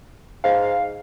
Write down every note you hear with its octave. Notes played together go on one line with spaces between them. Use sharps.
G#2 F5